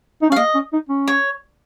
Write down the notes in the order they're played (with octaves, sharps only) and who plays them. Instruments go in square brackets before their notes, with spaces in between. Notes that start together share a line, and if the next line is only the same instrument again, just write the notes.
[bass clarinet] D#4
[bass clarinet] C#4 [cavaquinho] F5
[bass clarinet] A#3 [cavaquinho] D#5
[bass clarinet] C#4
D#4
C#4
[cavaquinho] C#5